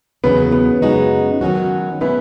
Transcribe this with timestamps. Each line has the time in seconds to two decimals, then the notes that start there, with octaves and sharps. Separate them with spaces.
0.24 E2 C#3 F#3 B3
0.52 B3
0.82 F#2 C#3 G#3 D#4 F#4
1.41 D#3 F#3 C#4 F#4
2.00 B2 G#3 B3 C#4 E4